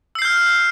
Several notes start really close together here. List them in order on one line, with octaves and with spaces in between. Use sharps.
E6 C7 G6 F6